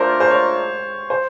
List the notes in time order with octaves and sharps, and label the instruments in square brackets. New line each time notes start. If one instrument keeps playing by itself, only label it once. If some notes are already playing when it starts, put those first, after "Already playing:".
Already playing: [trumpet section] A3 D4 F4 A#4 D5 [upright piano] C5
[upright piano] C5
C#5
C5